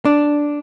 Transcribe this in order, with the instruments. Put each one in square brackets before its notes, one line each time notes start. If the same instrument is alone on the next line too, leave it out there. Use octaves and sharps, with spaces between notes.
[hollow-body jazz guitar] D4